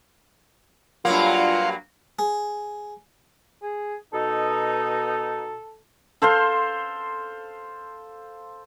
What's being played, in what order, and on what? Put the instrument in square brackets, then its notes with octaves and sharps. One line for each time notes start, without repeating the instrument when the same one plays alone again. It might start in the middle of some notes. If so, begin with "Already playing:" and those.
[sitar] G2 F#3 A#3 [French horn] F4 [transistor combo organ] F5 F#5 C6
[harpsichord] G#4
[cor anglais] G#4
[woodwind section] B2 D#4 [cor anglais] A4
[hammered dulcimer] A4 C5 F5 C6